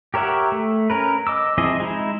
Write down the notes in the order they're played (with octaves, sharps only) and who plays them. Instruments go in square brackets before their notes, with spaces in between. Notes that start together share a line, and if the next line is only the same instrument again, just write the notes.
[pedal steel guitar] G4 A#4 C#5 E5 F#5
A3
C#4 A#4 B4
D#5 D6 E6
F3 C4 E4 G#4 D#5
G#3 D#4 E4